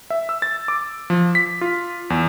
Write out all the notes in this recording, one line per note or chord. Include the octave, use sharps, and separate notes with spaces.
E5
E6
A6
D6
F3
B6
F4
E2